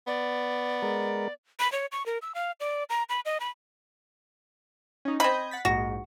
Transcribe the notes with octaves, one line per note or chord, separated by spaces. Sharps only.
B3 D5
G#3 A#4
B5
C#5
C#6
A#4
E6
F5
D5
A#5
B5
D#5
B5
C#4 D#4
C4 D#5 B5 G6 G#6
F#5 A6 B6
A#1 G#2 F#4